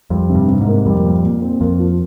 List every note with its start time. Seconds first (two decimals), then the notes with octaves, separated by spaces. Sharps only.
0.10 F2 G3
0.29 C3
0.35 G2
0.48 C3
0.61 G#2
0.67 A#3
0.86 F2 G3
1.04 A#2
1.24 A#2
1.42 C4
1.61 F2 A#3
1.80 F3